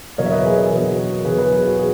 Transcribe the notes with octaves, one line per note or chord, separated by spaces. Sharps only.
E2 B2 F#3 A#4 C#5
E5
B4 D#5
G#4
G#4
E2 B2 F#3 F#4 A#4
E2 B2 F#3 G#4 B4
G#4 B4
G#4
F#4
G#4